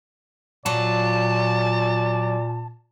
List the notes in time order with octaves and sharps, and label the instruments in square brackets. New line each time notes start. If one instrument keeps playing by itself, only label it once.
[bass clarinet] A#2 [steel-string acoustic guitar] F#3 F4 [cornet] D5 [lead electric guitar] A5